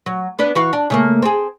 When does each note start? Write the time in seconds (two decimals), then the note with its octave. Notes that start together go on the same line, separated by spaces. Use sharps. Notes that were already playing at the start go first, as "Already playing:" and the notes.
0.06 F#3
0.39 B3 D4 B4
0.55 E3 F#4 F5
0.73 D4
0.90 C#3 A3 A#3
1.22 C4 G#4